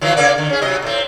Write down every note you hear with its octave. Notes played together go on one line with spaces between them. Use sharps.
D#3 E3 F#3
C#3 A#3 D5
D3 D#3
C#4 G#4
C3 F#3 D#5
A2 C4